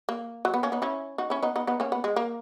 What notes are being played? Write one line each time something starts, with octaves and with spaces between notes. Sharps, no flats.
A#3
F#3
B3
A#3 C#4
B3 D#4
C#4 E4
D#4 F#4
C#4 E4
B3 D#4
B3 D#4
B3 D#4
A#3 C#4
B3
G#3
A#3